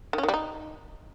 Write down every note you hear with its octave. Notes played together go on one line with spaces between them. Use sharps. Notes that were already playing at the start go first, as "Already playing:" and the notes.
D#3
C#4
D#3
G3
D#4